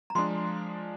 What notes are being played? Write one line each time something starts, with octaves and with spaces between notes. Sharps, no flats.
A#5
F3 G#3 D4 C6